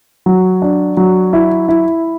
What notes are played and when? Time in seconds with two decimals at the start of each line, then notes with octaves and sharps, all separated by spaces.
0.26 F#3
0.62 D4
0.97 F#3
1.33 E4
1.68 E4